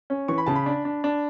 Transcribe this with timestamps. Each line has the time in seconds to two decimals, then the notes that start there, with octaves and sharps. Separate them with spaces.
0.10 C#4
0.28 E3 C#6
0.38 B5
0.46 C#3 A5
0.56 B5
0.66 D4
0.85 D4
1.04 D4